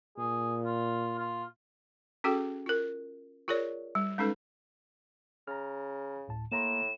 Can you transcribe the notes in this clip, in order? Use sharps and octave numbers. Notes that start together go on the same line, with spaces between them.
A#2 G#4
F4
F4
C#4 F#4 G#4 A4 G5
F4 A#4
F4 G#4 A#4 C#5 D5
G3
G#3 C#4 D#4 A4 B4
C#3 A#5 F6
D2 A2 A5
A2 A#3 A#5 C6 E7